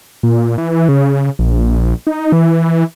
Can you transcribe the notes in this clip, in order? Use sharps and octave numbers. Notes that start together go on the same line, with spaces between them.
A#2
E3
C#3
A#1
D#4
E3